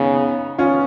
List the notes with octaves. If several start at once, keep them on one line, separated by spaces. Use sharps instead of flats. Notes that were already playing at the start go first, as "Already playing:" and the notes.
Already playing: C#3 B3 D#4
C#4 F4